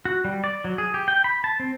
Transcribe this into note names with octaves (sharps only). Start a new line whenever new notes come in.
F#4
G3
D5
F#3
G#4
G4
G5
B5
A5
C4